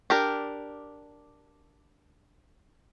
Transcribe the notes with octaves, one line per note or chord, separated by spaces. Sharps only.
D4 G4 A#4